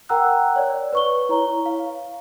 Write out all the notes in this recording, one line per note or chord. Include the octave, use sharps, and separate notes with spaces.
A#4 F#5 G5 A#5 E6 F#6
C#5 D5
B4 C#6 G7
E4 C#5 A#5
F5